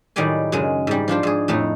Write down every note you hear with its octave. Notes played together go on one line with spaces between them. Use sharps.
A2 D#3 F#3 G3 D5 G#5
F#2 C#3 G#3
G#2 G3
F3 D4 F4 C5
G#2 G#4
F2 A2 A3 D#4